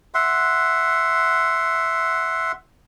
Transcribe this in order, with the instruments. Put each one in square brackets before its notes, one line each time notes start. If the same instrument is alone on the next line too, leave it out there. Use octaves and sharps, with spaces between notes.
[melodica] E5 F#5 C6